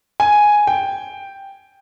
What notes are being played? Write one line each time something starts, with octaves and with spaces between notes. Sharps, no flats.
G#5
G5